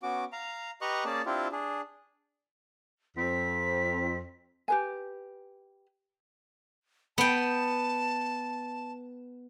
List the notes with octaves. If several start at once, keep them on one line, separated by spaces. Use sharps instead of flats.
B3 C#4 F#4 D6
F5 A#5
G4 B4 D#5 A#5 C#6 F#6
A#3 C#4 G#4 D5 A5
C4 D4 E4 F4 G4
D4 G#4
F2 C4 B6
G4 B4 G#5
B3 G5 A5